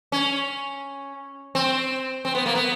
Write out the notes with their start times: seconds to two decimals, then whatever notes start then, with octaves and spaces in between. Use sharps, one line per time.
0.12 C#4
1.55 C4
2.25 C4
2.35 B3
2.46 A#3
2.55 B3